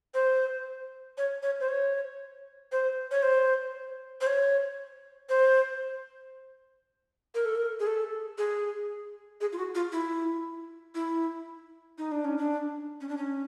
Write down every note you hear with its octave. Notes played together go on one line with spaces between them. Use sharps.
C5
C#5
C#5
C5
C#5
C5
C#5
C5
C5
C#5
C5
A#4
A4
A#4
G#4
A4
G#4
G#4
F4
F#4
F4
E4
E4
D#4
D4
C#4
D4
C#4
D4
C#4